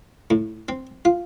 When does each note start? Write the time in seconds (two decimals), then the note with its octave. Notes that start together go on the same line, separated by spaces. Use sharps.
0.30 A2
0.69 C4
1.05 F4